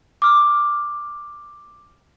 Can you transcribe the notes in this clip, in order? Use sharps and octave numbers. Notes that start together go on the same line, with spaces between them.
D6 F6